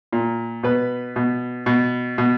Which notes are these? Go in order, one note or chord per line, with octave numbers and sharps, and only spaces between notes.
A#2
B2 B4
B2
B2
B2